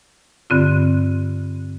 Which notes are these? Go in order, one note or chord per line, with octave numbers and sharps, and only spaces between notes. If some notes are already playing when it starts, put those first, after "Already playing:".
G2 D3 C4 F4